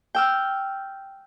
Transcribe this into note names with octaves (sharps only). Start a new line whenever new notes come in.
G5 E6 F6